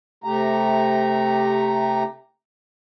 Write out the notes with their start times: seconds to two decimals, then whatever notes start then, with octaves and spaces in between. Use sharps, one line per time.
0.24 C3 A3 G4 A#5